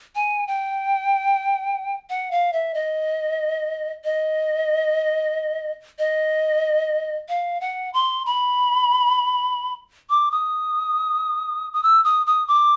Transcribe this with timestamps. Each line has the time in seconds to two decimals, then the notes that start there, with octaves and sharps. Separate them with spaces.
0.15 G#5
0.48 G5
2.10 F#5
2.31 F5
2.53 E5
2.74 D#5
4.05 D#5
5.99 D#5
7.29 F5
7.61 F#5
7.94 C6
8.26 B5
10.10 D6
10.31 D#6
11.73 D#6
11.83 E6
12.04 D#6
12.27 D#6
12.48 D6